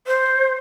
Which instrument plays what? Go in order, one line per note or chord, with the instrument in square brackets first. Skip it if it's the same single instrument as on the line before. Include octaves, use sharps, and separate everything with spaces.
[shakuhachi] C5